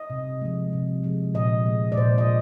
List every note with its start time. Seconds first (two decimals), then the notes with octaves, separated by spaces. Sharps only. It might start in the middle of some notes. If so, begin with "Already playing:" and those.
Already playing: D#5
0.10 C3
0.41 F3 G#3
0.73 C3
1.03 F3 G#3
1.34 A#2 D#5
1.66 G#3
1.92 D5
1.97 A#2 C5
2.18 D#5